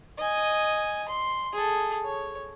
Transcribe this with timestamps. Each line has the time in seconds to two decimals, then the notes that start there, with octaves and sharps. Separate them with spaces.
0.18 D#5 G#5
1.08 C6
1.53 G#4 A4
2.05 C#5